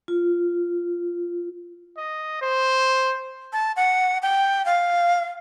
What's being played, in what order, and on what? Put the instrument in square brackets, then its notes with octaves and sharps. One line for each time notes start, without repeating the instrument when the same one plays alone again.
[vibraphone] F4
[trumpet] D#5
C5
[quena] A5
F#5
G5
F5